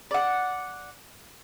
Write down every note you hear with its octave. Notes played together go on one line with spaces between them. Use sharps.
D5 F#5